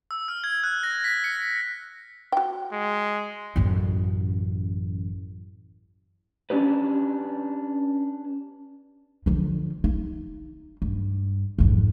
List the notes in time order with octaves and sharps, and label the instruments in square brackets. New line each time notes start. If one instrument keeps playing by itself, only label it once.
[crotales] E6
F6
G#6
F#6
A#6
B6
C#7
[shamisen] F#4 G5
[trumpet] G#3
[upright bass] A1 F#2
[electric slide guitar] C#4 D4 G4 B4
[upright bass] D3 F3
D#4
G2
G#1 F2